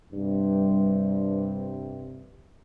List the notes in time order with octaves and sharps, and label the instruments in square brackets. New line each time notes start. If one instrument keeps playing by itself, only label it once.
[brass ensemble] G2 C3